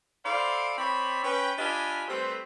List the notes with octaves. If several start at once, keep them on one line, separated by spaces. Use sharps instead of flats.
E4 A4 C5 D5 F5
C4 C#5 D5 B5
C#4 B4 G5
D4 F4 G4 D#5 G#5 B5
G3 A3 C4 A4 B4 C5